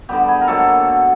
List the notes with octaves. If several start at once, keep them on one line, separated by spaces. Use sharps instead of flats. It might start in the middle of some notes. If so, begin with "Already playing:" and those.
D3 G3 B3 G4
G#4
A#4
B2 F#3 A#3 A4